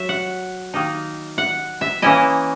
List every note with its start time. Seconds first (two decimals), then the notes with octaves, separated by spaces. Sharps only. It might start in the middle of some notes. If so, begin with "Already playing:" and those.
Already playing: F#3 E5
0.09 F#5
0.74 D#3 A#3 D#4
1.38 F#5
1.81 E5
2.02 E3 A#3 C#4 E4 D#5